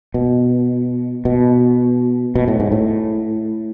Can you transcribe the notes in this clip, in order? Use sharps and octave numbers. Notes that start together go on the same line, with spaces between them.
B2
B2
B2
A2
G#2
A2